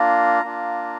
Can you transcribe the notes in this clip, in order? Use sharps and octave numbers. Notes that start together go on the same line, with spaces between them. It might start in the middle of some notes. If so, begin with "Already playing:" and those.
Already playing: A#3 D4 F4 A#5
A#3 D4 F4